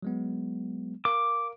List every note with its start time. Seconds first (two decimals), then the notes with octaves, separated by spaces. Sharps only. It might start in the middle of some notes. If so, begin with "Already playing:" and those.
0.02 F#3 G#3 B3
1.05 A#4 F5 D6